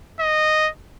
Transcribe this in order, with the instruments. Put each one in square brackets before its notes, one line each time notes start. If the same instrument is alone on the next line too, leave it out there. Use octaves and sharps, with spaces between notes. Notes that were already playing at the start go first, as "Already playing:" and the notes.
[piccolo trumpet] D#5